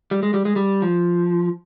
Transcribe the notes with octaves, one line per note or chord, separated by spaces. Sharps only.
G3
G#3
G3
G#3
G3
F3